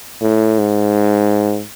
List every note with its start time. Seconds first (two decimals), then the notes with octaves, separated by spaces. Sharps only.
0.22 A2
0.59 G#2